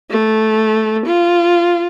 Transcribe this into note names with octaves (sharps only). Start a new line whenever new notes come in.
A3
F4